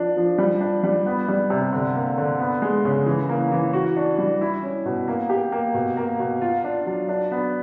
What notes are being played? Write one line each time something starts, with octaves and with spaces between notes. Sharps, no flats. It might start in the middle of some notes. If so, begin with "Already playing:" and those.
Already playing: F3 D4
F3
G3
D4
G3
B3
G3
C3
D3
A#3
D3
B3
G#3
C#3
E3
A#3
E3
F#4
D4
G3
E4
C#4
B2
A#3
G4
A#3
B2
A#3
B2
F4
D4
F#3
D4
B3